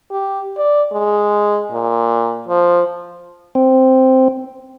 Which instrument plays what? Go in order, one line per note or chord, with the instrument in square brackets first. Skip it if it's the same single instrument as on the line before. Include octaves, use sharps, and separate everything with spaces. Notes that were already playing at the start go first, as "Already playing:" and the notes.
[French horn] G4
D5
G#3
A#2
F3
[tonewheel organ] C4